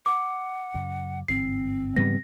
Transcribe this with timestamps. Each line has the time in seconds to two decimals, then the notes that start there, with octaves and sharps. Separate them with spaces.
0.06 F#5 D6
0.74 F#2 C#3 F#3
1.28 G1 G#2 E3 C4 C7
1.96 G#2 C#3 E3 F3 G3 B3 A#6